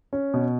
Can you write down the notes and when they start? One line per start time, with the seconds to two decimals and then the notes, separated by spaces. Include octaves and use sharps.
0.13 C#4
0.34 B2